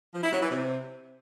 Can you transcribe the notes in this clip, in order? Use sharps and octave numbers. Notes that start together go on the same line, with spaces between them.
F3
E4
F#3
E3
C3